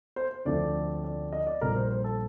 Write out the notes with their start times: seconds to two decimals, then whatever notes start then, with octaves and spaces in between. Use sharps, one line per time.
0.16 C5
0.45 D2 D3 F3 A3 C4 D5
1.04 D5
1.32 D#5
1.47 D5
1.61 A#1 A#2 G3 C4 A#4
1.76 C5
1.91 C5
2.04 A4